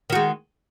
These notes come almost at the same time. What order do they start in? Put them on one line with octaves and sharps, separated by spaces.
D#3 F#4 G#3